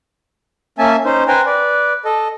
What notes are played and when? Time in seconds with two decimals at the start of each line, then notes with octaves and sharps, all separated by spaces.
0.79 A#3 C#4 E5 G#5 A5
1.05 C#4 D#4 C5
1.28 B4 C5 G5 G#5 A#5
1.46 B4 D5
2.05 A4 D#5